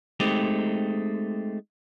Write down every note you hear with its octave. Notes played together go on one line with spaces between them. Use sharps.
G#3 A3 C4 D#4 G4